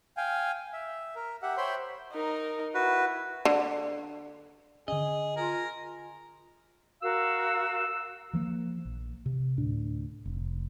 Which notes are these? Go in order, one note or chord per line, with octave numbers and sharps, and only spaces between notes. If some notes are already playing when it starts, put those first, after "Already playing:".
F5 G5 G#5
E5
A#4
G4 E5 F#5
C5 C#5 E5 G5 B5 C6
D#4 A#4
E4 F#4 B4
D3
D3 C#4 G#4 D#5
F4 A#4 G#5
F#4 A#4 F5 E6
E3 F3 A#3
A#1
C3
D2 A2 D4
F1